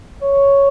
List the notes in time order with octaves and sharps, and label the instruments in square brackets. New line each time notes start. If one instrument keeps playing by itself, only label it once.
[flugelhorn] C#5